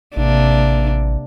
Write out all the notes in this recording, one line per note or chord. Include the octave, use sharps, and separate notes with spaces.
A1 C3 A#3 D4